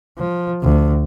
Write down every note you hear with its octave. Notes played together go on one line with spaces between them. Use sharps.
F3
D2